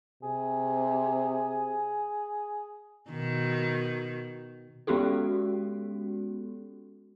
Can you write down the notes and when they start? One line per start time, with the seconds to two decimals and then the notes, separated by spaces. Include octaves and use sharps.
0.23 C3 G#4
3.10 B2 D#3
4.87 G#3 B3 C#4 F#4 G4 A4